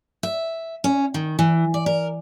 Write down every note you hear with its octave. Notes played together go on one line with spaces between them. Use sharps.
E5
C#4
D#3
E3
D5
A#4